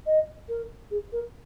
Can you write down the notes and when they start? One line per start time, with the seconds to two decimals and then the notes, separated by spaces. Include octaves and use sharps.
0.06 D#5
0.49 A#4
0.91 G#4
1.13 A#4